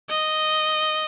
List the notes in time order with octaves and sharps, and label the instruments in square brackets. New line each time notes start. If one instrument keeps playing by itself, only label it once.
[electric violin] D#5